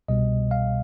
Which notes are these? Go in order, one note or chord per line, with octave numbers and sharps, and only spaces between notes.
C2 B2 G3 D#5
F5